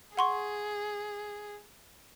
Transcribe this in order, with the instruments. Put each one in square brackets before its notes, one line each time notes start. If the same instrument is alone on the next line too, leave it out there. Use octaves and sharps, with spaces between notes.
[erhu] G#4 [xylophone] F#5 C6 C#6